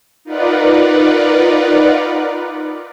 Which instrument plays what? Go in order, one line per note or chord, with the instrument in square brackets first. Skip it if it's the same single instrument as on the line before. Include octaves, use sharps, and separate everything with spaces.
[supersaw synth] D#4 F4 A#4 B4 D5 F#5